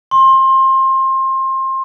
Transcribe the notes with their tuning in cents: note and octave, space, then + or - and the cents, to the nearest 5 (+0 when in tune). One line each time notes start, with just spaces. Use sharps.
C6 +25